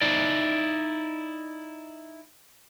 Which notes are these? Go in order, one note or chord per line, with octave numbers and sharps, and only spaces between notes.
D#4 E4 D5